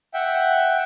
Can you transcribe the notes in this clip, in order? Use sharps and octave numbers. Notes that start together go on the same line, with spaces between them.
E5 F#5 G5